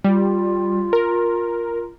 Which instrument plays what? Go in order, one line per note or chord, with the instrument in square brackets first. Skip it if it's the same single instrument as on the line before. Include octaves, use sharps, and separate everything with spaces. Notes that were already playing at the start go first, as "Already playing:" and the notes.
[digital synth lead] G3 [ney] F4
[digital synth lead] A#4